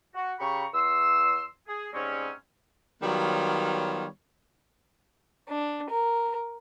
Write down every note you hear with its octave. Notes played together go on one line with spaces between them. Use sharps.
F#4
C#3 G4 A#5 B5 C#6
E2 C6 E6
G#4
G#2 G3 G#3 A#3 C4 C#4
D#3 F#3 G3 B3 F4 C#5
D4
A#4